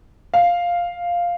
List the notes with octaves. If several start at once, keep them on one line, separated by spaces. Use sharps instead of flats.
F5